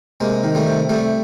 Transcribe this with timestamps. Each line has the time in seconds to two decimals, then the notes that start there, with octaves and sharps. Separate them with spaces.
0.20 C3 G#3 A#3
0.43 D#3
0.55 G3 A3
0.67 C3
0.89 C3 G3 A3